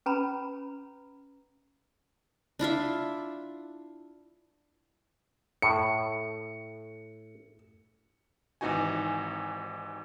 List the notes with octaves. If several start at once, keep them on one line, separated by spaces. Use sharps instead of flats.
C#4 B4 A#5 B5
D4 E4 F4 E5
A2 C#7
G#1 C3 E3 D#4 F#4 G#5